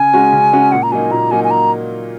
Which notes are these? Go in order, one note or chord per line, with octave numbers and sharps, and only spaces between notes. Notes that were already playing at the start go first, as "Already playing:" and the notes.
Already playing: C#3 G#5
G#3 C#4 F#4
C#3
G#3 C#4 F#4
A#2 F#5
A#5
F#3 A#3 D#4 G#5
A#2 A#5
F#3 A#3 D#4 G#5
G#5
A#5